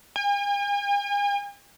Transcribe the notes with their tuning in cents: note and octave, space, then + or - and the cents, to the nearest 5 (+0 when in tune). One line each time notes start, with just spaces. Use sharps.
G#5 -45